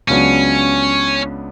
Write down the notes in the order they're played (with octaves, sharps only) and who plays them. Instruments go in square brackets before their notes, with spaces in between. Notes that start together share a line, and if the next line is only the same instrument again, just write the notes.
[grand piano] C#2 C#3 F#3 B3 D4 [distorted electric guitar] C#4